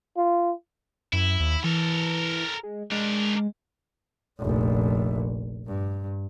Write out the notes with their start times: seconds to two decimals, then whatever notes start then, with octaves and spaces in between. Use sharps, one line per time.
0.17 F4
1.13 F#2 E4
1.40 D#2
1.64 E3 A4 A#4
2.63 G#3
2.91 G#3 D4 A#4
4.39 F1 A#1
5.67 G2